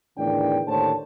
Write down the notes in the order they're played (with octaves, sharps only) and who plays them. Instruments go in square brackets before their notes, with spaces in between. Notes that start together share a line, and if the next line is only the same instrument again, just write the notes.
[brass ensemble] E2 A2 D3 D#3 D4 G5
D#2 A2 D3 C5 C#5 A5